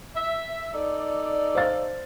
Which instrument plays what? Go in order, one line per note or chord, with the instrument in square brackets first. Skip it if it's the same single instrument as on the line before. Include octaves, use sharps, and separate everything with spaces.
[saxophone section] E5
D#4 A4 D5
[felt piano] C5 F5 A6